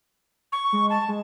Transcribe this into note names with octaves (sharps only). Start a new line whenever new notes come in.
C#6
G#3
A5
G#3